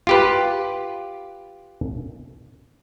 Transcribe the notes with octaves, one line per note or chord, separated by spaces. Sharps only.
F4 G4 B4